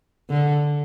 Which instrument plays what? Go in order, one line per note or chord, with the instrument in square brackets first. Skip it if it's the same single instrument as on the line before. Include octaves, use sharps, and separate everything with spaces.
[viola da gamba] D3